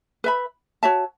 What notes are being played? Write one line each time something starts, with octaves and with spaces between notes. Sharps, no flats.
B4 E5 B5
F#4 C#5 E5 A5